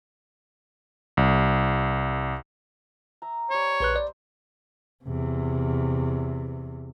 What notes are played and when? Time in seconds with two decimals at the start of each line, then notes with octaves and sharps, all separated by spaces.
1.17 C2
3.22 E5 A#5
3.50 G3 C5 C#5
3.80 A#1 B4 C5 F#6
3.96 D5
5.04 E2 C3